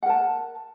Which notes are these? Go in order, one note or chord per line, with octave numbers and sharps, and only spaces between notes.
A#4 F#5 A5